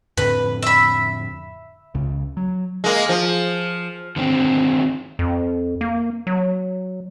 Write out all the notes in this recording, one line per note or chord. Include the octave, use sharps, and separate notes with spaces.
F2 A2 D3 B4
E5 B5
C#2 C#3
F#3
G#3 A#3
F3
D3 D#3 C4
F2
A#3
F#3